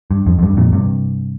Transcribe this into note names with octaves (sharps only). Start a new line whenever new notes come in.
G2
F2
F2
G2
F2 A#2
G2 C3